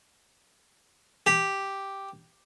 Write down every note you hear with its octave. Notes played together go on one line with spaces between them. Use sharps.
G4